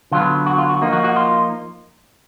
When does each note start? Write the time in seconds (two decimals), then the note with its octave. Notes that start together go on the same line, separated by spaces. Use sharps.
0.12 D3 F#3 B3 F4
0.46 F#4
0.58 F4
0.69 F#4
0.81 F3 A#3 D#4
0.93 F#4
1.04 F#4
1.16 F4